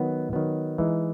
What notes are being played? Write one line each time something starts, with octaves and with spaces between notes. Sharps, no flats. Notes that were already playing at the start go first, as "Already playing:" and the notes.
Already playing: D#3 F#3 B3
D#3 F#3 B3
E3 G#3 D#4